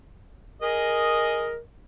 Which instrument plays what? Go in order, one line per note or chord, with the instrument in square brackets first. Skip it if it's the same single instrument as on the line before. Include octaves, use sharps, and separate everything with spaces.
[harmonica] G#4 D#5 [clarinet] A#4